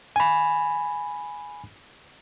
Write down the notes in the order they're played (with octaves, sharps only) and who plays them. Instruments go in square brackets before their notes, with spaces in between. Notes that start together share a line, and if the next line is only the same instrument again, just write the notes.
[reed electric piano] G#5 B5